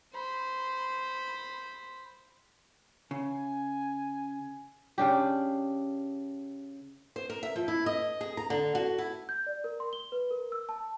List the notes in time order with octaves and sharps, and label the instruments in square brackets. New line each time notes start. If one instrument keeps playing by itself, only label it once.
[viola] C5 B5
[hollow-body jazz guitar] C#3 [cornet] G#5
[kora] C#3 D4 G4
[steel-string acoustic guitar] C5
A#4
E5
F3
E4
D#5
G#4
A#5
D3
F#4
E4
[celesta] G6
D5
A#4
C6
G7
B4
A#4
E6
A5